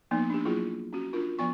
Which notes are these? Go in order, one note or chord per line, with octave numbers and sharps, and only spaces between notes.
F3 A#3 B3 D#4
D4 G4
F#3 A#3 E4 F4 G#4
C#4 F#4
D4 F4 A#4
F3 B3 C#6